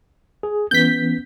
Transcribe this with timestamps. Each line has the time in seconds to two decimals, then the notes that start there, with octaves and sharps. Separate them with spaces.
0.43 G#4
0.71 E3 B3 C#4 G6 B6